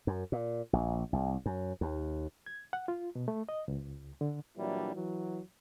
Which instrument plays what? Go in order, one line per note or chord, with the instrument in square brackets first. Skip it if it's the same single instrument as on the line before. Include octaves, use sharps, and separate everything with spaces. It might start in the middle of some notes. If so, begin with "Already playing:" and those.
[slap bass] F#2
A#2
A#1
C2
F#2
D#2
[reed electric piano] G#6
F#5
F4
B2
A3
D#5
C#2
D3
[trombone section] A#2 E3 F#3 G3 D4 E4
E3 F#3